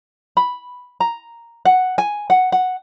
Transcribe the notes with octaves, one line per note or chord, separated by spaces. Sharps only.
B5
A#5
F#5
G#5
F#5
F#5